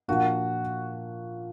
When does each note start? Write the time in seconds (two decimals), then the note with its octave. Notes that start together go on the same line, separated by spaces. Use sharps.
0.08 A#2 F3 A#3 D4 F#4